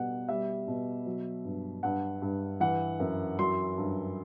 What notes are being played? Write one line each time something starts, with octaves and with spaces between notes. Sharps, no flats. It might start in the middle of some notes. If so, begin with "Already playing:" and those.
Already playing: B2 G3 F#5
G3 E5
B2
F#3
G2
G2 F#5
G2
E3 F#5
F#2
F#3 C6
G2